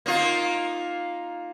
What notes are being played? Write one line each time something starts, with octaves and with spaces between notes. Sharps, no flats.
A#3 D#4 F4